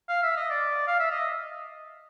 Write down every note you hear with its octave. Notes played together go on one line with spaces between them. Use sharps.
F5
E5
D#5
D5
F5
E5
D#5